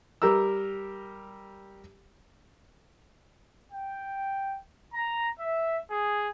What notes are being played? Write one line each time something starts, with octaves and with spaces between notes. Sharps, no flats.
G3 G4 A#4 A#5 E6
G5
A#5
E5
G#4